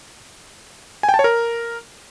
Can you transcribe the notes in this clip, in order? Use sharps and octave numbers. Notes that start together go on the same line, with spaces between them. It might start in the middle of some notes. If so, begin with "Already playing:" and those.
G#5
G5
A5
C#5
A#4